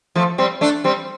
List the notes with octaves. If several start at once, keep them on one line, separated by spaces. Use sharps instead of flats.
F3 A3
G3 C4
A3 D4
G3 C4